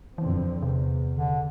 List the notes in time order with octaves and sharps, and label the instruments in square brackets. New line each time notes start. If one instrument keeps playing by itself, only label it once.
[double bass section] F2 D3 C4 [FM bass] E3
[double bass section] E2 [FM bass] C3
[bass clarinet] D3